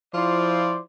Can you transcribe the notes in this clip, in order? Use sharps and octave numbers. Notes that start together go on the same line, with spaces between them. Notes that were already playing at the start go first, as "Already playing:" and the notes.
F3 E4 F4 C5 D5